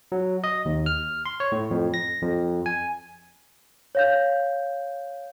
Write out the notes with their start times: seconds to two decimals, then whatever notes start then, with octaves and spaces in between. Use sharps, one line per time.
0.12 F#3
0.44 D#5
0.65 D#2
0.86 F6
1.26 C6
1.40 C#5
1.52 A2
1.71 F2
1.94 A#6
2.22 F2
2.66 G#5
3.95 C#5 F5 G6